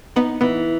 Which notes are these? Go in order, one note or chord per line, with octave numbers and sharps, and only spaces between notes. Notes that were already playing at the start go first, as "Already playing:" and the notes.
B3 D#4
E3 B3